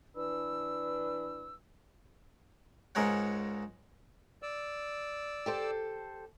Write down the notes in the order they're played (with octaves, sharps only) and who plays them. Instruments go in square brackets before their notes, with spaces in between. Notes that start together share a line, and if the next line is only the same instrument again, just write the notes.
[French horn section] E3 D4 B4 [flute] E6
[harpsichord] C#2 G#2 C#3 A#4 C#5 F#5
[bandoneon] D5 E6
[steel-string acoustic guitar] G4 A4 C5